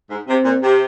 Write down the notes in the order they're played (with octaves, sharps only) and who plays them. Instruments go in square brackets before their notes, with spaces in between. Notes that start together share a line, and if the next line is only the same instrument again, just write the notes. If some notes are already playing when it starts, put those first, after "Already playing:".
[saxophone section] G#2
[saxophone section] C3 [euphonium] C4
[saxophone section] A#2
C3